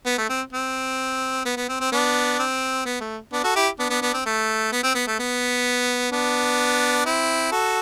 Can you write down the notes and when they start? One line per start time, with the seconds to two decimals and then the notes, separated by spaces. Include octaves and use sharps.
0.06 B3
0.18 A3
0.29 C4
0.53 C4
1.46 B3
1.57 B3
1.69 C4
1.81 C4
1.92 B3 D4
2.39 C4
2.85 B3
3.01 A3
3.32 B3 D4
3.44 F#4 A4
3.56 E4 G4
3.79 B3 D4
3.90 B3 D4
4.02 B3 D4
4.14 C4
4.26 A3
4.72 B3
4.83 C4
4.95 B3
5.08 A3
5.19 B3
6.12 B3 D4
7.06 C4 E4
7.52 F#4 A4